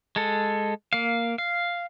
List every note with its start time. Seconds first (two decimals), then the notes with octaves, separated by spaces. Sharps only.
0.16 G#3 A4
0.93 A#3 F5
1.38 F5